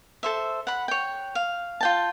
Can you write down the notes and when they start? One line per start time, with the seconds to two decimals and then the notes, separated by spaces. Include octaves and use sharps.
0.23 A4 C5 E5
0.67 F#5 B5
0.88 C#5 G5
1.35 F5
1.81 F4 G5 A5